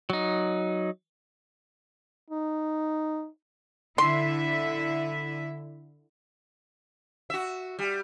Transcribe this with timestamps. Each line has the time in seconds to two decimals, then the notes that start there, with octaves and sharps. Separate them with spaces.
0.10 F#3 D#4
2.31 D#4
3.98 D3 E4 E5 C6
7.30 F#4 E5
7.79 G3